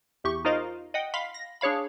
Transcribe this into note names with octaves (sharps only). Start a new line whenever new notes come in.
E2 G4 C#6
D#4 F4 A#4 C5 D#5 F5
D#5 F#5 G5
F5 B5 C6 B6
A#6
D4 G#4 C#5 F5 B5